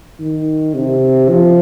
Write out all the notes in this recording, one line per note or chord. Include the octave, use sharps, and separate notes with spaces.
D#3
C3
F3